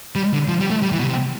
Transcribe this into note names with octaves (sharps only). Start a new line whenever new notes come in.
G3
D3
F3
G3
A3
G3
E3
B2
C3